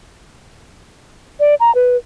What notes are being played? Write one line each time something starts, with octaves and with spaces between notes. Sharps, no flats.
D5
A#5
B4